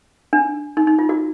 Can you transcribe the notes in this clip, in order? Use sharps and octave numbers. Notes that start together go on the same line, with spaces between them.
D4
D#4
D#4
F4
F#4